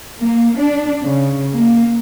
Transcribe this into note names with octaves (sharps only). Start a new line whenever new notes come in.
A#3
D4
C#3
A#3